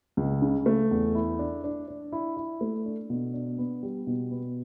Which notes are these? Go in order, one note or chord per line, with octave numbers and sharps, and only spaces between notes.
C#2
C#3
A3
E2
E4
D4
D4
D4
E4
E4
A3
D4
B2
D4
B3
G3
B2
B3